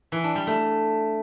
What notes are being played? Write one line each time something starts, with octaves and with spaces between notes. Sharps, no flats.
E3
D4
G3
A3